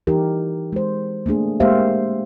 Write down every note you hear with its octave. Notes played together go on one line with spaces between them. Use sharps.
E3 D#4 G4 A#4
G#3 C5
A3 A#3 D4 G#4
G#3 A#3 G4 C5 E5 F5